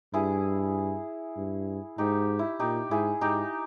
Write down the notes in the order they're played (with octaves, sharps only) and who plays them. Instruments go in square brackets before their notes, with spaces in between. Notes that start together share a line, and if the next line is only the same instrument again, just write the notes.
[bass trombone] G2 [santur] E4 G#4
[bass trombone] G2
[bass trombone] G#2 [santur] D#4 G4
[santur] E4
[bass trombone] A#2 [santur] D#4 G4
[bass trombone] G#2 [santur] E4 G#4
[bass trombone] G#2 [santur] D#4 G4